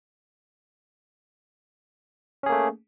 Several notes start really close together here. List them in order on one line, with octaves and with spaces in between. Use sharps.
C#4 G#4 A#3 A3